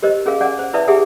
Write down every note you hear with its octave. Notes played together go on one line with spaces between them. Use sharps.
G4 A#4 C5 D#5
C#4 G#4 A#4 F5
C#4 D5 F#5 G#5 D6
C5
E4 B4 D5 E5 A5 D#6
G4 G#4 E5 F#5 G#5 D#6